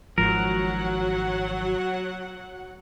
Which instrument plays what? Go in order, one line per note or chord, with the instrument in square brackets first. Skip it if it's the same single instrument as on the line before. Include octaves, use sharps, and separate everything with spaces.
[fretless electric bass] G#1 G#2 F3 [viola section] F#3 F#5 [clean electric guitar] A#4